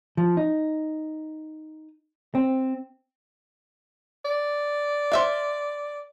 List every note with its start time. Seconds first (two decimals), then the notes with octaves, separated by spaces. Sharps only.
0.17 F3
0.37 D#4
2.35 C4
4.25 D5
5.12 C5 E5 F5